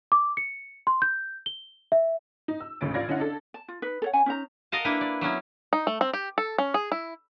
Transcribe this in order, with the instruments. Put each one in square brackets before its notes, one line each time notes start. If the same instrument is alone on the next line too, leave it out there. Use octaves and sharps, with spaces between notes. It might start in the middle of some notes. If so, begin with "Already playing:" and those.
[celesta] D6
C#7
C6
G6
G7
E5
[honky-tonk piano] D#4
E6
A1 D2 C#3 C#4 A6 D7
A1 F4 D5 F5 G#6 A#6
D3 C#4 E4 D#5 F5 F#5
D4 A4
[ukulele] A5
F4
D#4 B4
A4 C#5 F#5
C#4 F#5 G#5
C#4 D#4 C5 A#5
[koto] A#4 D#5 F5 F#5 A5
A#3 D4 E4 B4
D5
F#3 B3 C#4 E4
[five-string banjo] D#4
A3
C4
G4
A4
C#4
G#4
E4